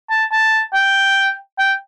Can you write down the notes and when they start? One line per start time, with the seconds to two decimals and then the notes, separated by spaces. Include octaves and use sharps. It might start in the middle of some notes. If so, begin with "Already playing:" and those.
0.10 A5
0.32 A5
0.74 G5
1.59 G5